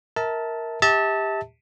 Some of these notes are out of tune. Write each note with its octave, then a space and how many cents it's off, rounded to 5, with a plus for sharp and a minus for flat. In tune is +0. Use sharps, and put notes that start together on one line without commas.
A#4 +0 E5 -35 A5 +0
G4 +25 E5 -35 A5 +5